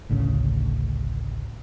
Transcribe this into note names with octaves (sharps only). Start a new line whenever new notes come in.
A1 D2 A2 C#3